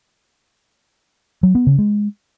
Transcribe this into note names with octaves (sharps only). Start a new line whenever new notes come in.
F#3
B3
C#3
G#3